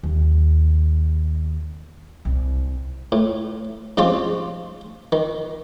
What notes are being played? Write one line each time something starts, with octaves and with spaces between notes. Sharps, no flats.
D#2
C2
A2
G#2 F3 C4 C#4 F4 G4
D#3